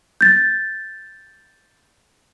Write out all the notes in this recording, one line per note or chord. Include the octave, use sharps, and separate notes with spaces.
G6 A6